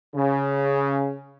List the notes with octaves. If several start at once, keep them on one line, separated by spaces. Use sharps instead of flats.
C#3